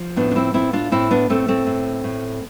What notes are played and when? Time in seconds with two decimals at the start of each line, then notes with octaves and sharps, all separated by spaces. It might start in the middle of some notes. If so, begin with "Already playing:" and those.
Already playing: F3
0.16 A2 B3 D4
0.31 D4
0.36 C4 E4
0.54 A2 C4 E4
0.73 D4 F4
0.92 A2 C4 E4
1.11 B3 D4
1.30 A2 A3 C4
1.48 A3 C4
1.67 A2
2.04 A2